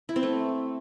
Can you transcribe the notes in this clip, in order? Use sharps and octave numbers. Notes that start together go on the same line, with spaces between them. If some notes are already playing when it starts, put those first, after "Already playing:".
E4
C4
A3